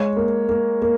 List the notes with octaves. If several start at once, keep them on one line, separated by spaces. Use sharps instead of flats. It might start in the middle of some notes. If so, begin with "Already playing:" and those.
Already playing: G#3 C#5
A#3
A#3
A#3